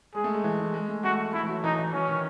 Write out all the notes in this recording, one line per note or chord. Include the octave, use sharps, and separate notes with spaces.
G#3 G#4
A3
G#3
E3
E3
G#3
A3
A3 F#4
A3 E4
E3
F#3
E3 D#4
E3
E3 C#4
D#3